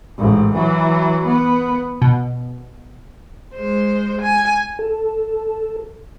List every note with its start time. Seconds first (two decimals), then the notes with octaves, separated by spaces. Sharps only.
0.18 A1 G#2
0.53 E3 F#3
1.26 B3
2.02 B2
3.55 G#3 C5
4.21 G#5
4.79 A4